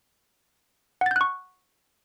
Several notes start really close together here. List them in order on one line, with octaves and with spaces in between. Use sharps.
F#5 A6 G6 F#6 C#6